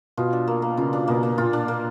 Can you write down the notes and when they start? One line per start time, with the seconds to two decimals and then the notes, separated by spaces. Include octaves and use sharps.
0.17 B2 F4
0.33 D4
0.48 A#3
0.62 A#3
0.77 C#3 F4
0.93 D4
1.08 B2 A#3
1.23 A#3
1.38 A#2 F4
1.53 D4
1.68 A#3